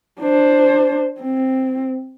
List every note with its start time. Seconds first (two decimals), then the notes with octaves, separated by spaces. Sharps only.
0.20 D4 C5
1.20 C4